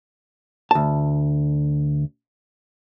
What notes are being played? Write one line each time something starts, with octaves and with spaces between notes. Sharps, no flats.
D2 A5